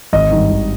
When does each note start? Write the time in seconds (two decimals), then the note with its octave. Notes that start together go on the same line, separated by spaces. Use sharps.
0.13 G#1 D#5
0.31 G2 D#3
0.50 G#1